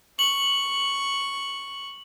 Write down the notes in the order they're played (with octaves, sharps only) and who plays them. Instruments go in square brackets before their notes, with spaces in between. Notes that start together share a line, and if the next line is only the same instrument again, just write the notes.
[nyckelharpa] C#6 [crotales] F#7